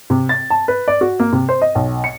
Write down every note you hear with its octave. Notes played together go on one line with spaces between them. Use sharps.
C3
A6
A5
B4
D5
F#4
A#3
C3
C5
D#5
B1
C#7